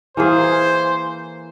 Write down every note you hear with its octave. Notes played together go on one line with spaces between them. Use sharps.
E3 A#3 G#4 C5